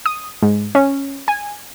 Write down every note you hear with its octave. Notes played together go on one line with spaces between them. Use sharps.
D#6
G#2
C#4
G#5